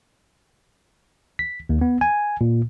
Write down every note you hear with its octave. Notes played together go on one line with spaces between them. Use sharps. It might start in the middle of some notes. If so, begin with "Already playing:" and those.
B6
D#2
B3
G#5
A#2